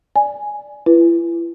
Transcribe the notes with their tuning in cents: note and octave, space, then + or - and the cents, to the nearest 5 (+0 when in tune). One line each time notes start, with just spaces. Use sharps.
D5 +0 G#5 +0
E4 +40 B4 -5